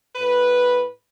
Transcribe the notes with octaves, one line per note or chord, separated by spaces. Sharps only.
A2 B4